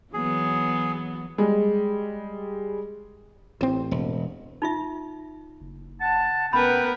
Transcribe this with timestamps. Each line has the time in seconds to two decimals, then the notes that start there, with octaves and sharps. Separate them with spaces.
0.13 E3 F#3 B3 G#4
1.38 G3 G#3
3.61 A1 C4
3.91 E1
4.62 D#4 F4 E5
5.61 F#1
6.00 F#5 A5
6.53 E1 B3 C#4 A#4 B4 F#5 G5 B5